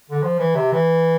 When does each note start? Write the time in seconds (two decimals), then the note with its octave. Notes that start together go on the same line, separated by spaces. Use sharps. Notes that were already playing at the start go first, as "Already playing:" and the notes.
0.10 D3
0.23 F3
0.39 E3
0.55 C3
0.72 E3